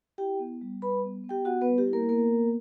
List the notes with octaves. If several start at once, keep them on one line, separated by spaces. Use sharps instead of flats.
E4 G4 G5
B3
G3
G3 B4 B5
B3
B3
G4 G5
B3 F#4 F#5
B3 B4
G3
G4
E4
A#3 A#4
A#3 B3 A#4
B3